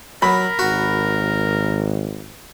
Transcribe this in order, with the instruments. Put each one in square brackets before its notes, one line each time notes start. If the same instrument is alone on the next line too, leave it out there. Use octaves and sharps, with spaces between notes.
[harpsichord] F#3 [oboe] A#4 [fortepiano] B5
[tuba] G#1 [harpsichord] F#4